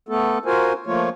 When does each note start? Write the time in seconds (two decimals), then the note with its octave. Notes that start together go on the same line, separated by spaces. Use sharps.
0.09 A3 B3 A4
0.45 F4 F#4 A#4 C5 G#5
0.86 F3 A3 A#3 F4 C#5